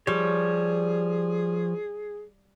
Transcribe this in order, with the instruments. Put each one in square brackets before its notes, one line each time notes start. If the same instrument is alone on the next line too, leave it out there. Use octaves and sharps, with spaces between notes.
[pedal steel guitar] F3 C#5 [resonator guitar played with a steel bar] G3 [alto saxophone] G#4